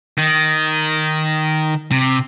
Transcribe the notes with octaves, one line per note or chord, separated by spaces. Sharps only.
D#3
C3